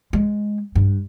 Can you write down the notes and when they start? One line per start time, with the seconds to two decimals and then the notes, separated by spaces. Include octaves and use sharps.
0.13 G#3
0.75 G2